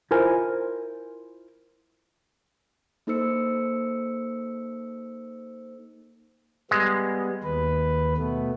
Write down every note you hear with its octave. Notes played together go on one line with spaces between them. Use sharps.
E4 F4 A#4 C5 G#5
A#3 D#4 A4 C5 E6 C#7
G3 G#3 B3
D#2 B4
B2 A3 B3